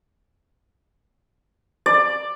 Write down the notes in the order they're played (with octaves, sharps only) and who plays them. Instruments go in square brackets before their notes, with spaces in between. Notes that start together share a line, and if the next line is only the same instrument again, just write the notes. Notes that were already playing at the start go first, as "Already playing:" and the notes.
[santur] D5